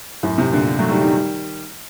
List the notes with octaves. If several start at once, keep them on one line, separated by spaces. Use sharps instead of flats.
F#2 A2
A2 C3
A#2 D3
F#3 A3
D#3 G3
D#3 G3